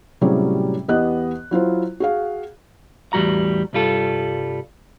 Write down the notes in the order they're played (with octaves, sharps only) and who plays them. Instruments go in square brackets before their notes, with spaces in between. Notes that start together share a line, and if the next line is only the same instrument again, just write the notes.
[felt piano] A2 C3 F#3 G3 C#4 G#4
E2 B3 G4 D#5 F#6
F#3 E4 F4 C5
F#4 G#4 F5
[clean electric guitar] E2 A2 C#3 G3 F#4 A#5
C2 G2 G3 F4 A4